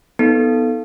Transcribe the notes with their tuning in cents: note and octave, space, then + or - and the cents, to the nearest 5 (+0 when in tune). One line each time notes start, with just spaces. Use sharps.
B3 +0 D#4 +15 A4 +0